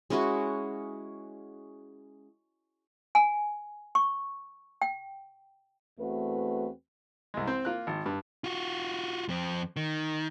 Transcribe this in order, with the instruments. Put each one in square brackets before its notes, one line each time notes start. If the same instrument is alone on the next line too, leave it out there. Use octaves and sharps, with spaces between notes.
[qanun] G#3 C#4 E4 F#4
[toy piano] G#5
C#6
G5
[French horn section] E2 A3 C4 F#4 B4
[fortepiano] C2 G#3
C4 C5
A#3 F4 A#4 F#6
G#1
G2
[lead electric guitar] F4 F#4
F2 C4
D#3